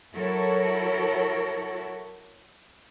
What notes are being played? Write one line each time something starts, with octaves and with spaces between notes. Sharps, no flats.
F#3 E4 F#4 A4 A#4 C#5